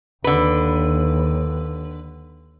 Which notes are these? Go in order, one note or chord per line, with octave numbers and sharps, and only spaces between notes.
D#2 D3 B4